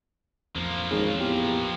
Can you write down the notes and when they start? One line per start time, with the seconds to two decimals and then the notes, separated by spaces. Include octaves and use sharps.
0.56 A1 F2 F3 A#3
0.91 G#1 C#3
1.20 E2 G4